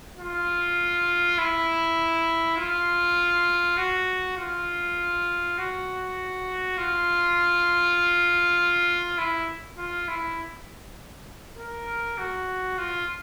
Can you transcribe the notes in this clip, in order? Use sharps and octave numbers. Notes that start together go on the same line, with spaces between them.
F4
E4
F4
F#4
F4
F#4
F4
E4
F4
E4
A#4
F#4
F4